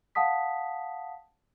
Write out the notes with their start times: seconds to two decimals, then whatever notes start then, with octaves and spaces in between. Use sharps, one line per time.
0.15 F5 F#5 A5 D#6 B6